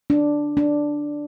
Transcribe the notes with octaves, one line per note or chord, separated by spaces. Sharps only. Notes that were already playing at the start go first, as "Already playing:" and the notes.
D4
D4